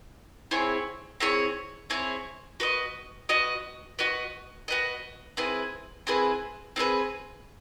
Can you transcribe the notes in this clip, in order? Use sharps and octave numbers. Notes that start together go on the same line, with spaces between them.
C4 E4 G#4 C#5
C4 E4 G#4 C#5
C4 E4 G#4 C#5
F#4 B4 D#5
F#4 B4 D#5
F#4 B4 D#5
F#4 B4 D#5
C4 E4 G#4 B4
C4 E4 G#4 B4
C4 E4 G#4 B4